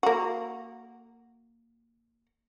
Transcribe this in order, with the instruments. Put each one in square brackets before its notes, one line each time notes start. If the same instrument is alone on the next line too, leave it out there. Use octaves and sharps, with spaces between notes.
[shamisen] A#3 F#4